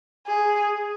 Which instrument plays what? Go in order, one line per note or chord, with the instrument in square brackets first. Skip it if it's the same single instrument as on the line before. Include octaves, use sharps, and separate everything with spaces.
[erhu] G#4